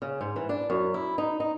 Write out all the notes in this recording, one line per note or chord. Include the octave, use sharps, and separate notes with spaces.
C#3
G#2
E3
D4
F#2
E4
D#4
D#4